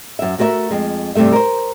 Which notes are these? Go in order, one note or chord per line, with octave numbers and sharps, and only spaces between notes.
F#2 E5
A3 F#4 A#4 C5 E5
F2 G#3
G2 C3 E3 A3 E5
A#4 C5